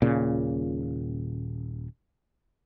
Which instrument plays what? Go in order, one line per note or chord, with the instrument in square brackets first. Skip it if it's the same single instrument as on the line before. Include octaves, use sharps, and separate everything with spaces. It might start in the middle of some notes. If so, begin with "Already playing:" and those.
[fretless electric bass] D#1 A#2 C#3